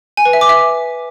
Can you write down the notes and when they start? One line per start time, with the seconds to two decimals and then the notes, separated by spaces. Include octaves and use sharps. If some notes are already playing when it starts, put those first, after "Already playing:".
0.17 G#5
0.25 B4
0.33 E5
0.41 D6
0.49 E5